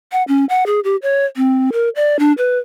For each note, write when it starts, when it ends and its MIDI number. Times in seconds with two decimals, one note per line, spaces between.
0.12 0.23 78
0.28 0.45 61
0.49 0.64 78
0.66 0.80 68
0.84 0.96 67
1.02 1.26 73
1.37 1.70 60
1.73 1.89 70
1.96 2.19 74
2.19 2.33 62
2.38 2.58 71